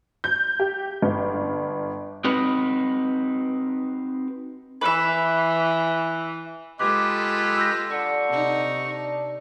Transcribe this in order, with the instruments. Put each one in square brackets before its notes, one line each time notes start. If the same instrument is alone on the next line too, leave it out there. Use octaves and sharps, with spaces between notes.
[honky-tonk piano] G6
G4
G1
[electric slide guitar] C4 D#4 F#4 B4
[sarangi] E3 [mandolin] B4 E5
[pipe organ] G#3 G4 B4 [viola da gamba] F4 A4 [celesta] D6
[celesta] E6 G6 A#6
[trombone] D3 [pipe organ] C#6
[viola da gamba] C3 D#4
[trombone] D4